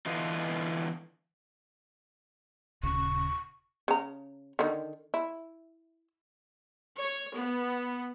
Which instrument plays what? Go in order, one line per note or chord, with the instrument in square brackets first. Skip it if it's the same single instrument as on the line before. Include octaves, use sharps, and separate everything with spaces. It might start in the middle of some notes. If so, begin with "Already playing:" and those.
[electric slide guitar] D3 E3 B3 F4 D#5
[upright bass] D#1 C#3 [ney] C#6
[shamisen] C#3 A#5
D3 D#3
E4
[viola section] C#5
B3